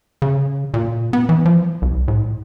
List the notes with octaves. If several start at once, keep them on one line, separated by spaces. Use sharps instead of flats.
C#3
A#2
B3
E3
F3
C2
A2